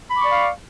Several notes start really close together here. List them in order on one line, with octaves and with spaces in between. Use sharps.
B5 D6 C#6 D5 F5